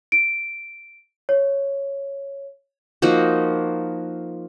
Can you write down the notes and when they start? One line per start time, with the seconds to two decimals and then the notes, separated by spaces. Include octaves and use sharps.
0.12 D7
1.29 C#5
3.02 F3 A#3 D#4 F#4